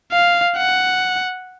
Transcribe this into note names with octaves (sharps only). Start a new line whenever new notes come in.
F5
F#5